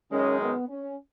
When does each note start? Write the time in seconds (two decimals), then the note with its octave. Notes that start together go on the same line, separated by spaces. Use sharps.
0.12 F#2 D#3 G#3 C#4
0.40 B3
0.69 C#4